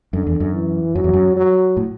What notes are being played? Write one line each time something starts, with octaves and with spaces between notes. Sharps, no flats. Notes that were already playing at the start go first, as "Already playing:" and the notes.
F#2 D3
E2
F#2
E3
F#2 F#3
E2
F#2
F#3
A2